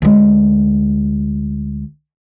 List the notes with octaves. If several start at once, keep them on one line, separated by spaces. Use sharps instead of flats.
D2 G#3